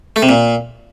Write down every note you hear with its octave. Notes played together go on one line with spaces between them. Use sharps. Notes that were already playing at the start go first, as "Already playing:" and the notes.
A3
C3
A#2